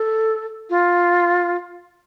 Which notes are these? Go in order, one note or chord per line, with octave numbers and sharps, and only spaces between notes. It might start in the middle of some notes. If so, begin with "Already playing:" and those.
Already playing: A4
F4